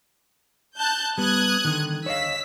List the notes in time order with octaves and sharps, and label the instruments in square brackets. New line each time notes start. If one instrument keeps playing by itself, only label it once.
[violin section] A5 F#6 G6
[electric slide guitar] G3 B3 [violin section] D#6 F#6 G#6
[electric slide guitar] D3 D#3
[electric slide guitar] C#5 D#5 F5 [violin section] E6 B6